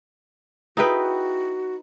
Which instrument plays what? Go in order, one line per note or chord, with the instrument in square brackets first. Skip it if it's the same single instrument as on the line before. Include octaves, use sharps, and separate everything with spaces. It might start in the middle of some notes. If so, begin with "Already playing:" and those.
[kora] D#4 B4 [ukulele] E4 G#4 G5 [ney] F#4